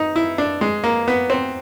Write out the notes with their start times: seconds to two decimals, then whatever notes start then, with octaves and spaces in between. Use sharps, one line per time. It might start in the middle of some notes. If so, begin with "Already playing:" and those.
Already playing: D#4
0.16 E4
0.38 D4
0.61 G#3
0.84 A#3
1.08 B3
1.30 C4